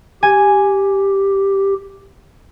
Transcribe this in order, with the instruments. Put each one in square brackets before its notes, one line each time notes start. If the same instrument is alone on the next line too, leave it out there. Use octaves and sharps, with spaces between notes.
[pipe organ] G4 [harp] G#5